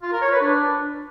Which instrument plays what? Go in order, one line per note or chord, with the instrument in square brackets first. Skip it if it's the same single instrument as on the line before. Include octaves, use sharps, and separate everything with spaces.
[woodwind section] F4
A#4
C#5
B4
D4